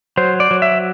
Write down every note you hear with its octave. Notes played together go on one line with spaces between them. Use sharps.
F#3 C5
D5
F#3
E5